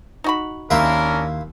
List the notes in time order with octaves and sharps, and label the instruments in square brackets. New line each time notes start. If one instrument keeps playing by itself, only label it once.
[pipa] D#4 F#4 B5
[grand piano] D#2 [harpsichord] A#3 E4 C5 [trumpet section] C#4 D4 A#4